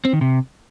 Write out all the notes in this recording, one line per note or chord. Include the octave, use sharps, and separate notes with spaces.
C4
D#3
C3